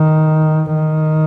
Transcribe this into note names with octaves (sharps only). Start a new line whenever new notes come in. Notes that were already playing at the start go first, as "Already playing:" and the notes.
Already playing: D#3
D#3